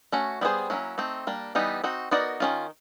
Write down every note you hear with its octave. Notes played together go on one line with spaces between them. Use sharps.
A3 C#4 F#4
G3 B3 E4 G#4 C5
F#3 A#3 C#4 E4
A3 C4 D#4
G3 A#3 D4
E3 G3 B3 D#4
C4 D#4 F#4
B3 D#4 F#4 A#4 D5
D#3 G#3 C#4 F4